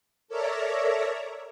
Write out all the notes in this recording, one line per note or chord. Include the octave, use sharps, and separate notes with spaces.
A4 A#4 C#5 D5 E5 A#5